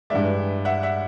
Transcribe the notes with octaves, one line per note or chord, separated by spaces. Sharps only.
G2 E3 G#3 D5 E5
E5 F#5
E5 F#5